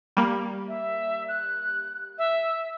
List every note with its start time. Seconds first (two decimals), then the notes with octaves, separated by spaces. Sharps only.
0.17 G3 A#3
0.68 E5
1.28 F#6
2.18 E5